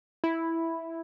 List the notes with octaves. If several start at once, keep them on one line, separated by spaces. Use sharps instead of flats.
E4